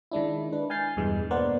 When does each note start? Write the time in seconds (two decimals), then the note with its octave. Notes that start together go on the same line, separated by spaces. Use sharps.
0.12 D#3 G#3 D4 E4
0.52 D4 B4
0.70 G#5 F6 G6 A6 C7
0.97 E2 G2 B2 E3 G#3
1.31 A#3 B3 A#4 C5 D5 F#5